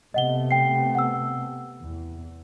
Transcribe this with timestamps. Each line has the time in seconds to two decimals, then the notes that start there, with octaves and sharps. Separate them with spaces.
0.14 C3 A3 B3 D#5 F#5 G7
0.51 G5 C7
0.95 F#5 E6
1.81 E2